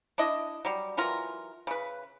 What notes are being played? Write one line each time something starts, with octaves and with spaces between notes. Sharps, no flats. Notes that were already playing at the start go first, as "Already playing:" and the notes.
D4 E4 D#5
F#3 G3
E3 F#3 F4 A#4
C#3 B4